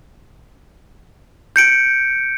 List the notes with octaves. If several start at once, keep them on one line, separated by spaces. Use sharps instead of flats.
G6 C#7 D7